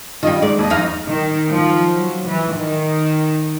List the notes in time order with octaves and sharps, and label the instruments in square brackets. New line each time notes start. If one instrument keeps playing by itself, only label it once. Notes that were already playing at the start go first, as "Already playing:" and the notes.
[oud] D#3 G3 [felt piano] F4 D#5 G5
[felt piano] G#2 [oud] D5
[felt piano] D#2 D#5
[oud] F2 D#4 F5
[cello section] D#3
F3
F#3
E3
D#3